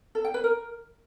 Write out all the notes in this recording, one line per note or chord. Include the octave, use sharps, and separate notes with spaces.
A4
G5
B4
A#4